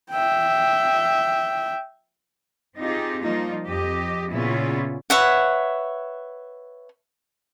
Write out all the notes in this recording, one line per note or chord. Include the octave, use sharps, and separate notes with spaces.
E5 G5
C4 D#4 F4 G4 G#4
F3 G3 A#3 D#4 F4
F2 G4 D#5
A#2 C#3 B3 C#4 E4 F4
B4 C#5 E5 F#5